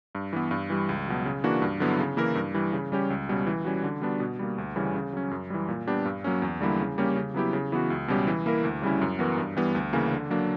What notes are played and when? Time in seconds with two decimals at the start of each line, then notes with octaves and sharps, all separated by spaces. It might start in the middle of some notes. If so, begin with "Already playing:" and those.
0.15 G2
0.33 E3 B3
0.51 G2
0.70 E3 G3
0.89 C#2
1.07 B2 F#3
1.25 C#3
1.44 E3 A#3 D4 F#4
1.62 G2
1.80 D3 F#3 B3 E4
1.99 C#3
2.17 E3 A#3 E4 A#4
2.35 G2
2.54 E3 G3
2.73 C#3
2.92 G3 C#4 G4
3.10 C#2
3.29 B2 G3 C#4
3.47 E3
3.65 G3 C#4 F#4
3.84 D3
4.02 G3 B3 D4 F#4
4.20 B2
4.39 G3 A#3
4.58 D2
4.76 C#3 E3 G3 C#4
4.95 C#3
5.13 F#3 C#4
5.31 F#2
5.50 E3 G3
5.68 A#2
5.87 G3 B3 D4 G4
6.05 G2
6.24 F#3 A#3 C#4
6.42 E2
6.61 D3 G3 A#3 E4
6.80 C#3
6.98 G3 A#3 C#4 G4
7.16 C#3
7.34 F#3 B3 E4 G4
7.53 C#3
7.72 E3 B3 F#4
7.90 C#2
8.08 B2 G3 C#4 G4
8.27 E3
8.46 A#3 E4 A#4
8.64 D2
8.82 C#3 G3 C#4 E4
9.01 F#2
9.19 E3 B3 F#4 A#4
9.37 G2
9.57 E3 G3 B3
9.75 D2
9.93 C#3 E3 A#3 C#4
10.12 D3
10.30 F#3 A#3 D4